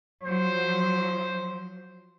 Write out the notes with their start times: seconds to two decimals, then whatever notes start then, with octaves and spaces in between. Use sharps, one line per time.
0.23 F3 F#3 C5